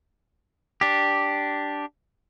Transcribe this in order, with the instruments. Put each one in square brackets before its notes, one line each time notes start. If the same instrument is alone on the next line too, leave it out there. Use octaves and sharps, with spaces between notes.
[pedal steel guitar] D4 G4